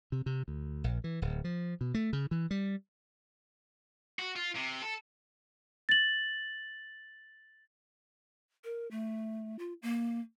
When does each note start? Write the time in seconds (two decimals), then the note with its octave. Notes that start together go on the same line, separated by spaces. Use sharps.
0.12 C3
0.26 C3
0.48 D2
0.84 A#1
1.04 E3
1.22 D1
1.44 F3
1.81 B2
1.94 A3
2.13 C#3
2.31 E3
2.51 G3
4.19 F#4
4.36 F4
4.56 C3
4.82 A4
5.89 A6 F#7
8.64 A#4
8.91 A3
9.59 F4
9.82 A#3